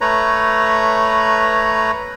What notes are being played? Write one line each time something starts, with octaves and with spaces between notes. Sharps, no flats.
A3 B4 C#5 A#5